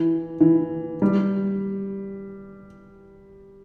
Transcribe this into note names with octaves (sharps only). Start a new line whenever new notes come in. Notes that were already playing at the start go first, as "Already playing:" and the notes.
Already playing: E3
E3
G3